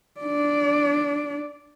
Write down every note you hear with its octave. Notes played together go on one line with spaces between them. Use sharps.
D4 D5